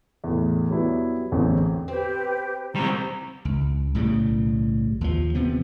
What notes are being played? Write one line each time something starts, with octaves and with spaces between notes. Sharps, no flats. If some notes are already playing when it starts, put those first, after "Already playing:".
E2 A2
F#3 G3 B3 E4
A1 E2 D3 C4
C4 G4 B4
G3 C4 C5 A#5 C#6
C#2
B1 A2 C#3 G3
D#2 F3
C3 F3 B3